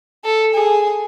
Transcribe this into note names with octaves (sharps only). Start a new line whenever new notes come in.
A4
G#4